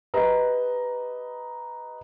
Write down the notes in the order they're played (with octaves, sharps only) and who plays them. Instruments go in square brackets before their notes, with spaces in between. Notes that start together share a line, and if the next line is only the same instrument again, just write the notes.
[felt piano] G4 B4 D#5 A#5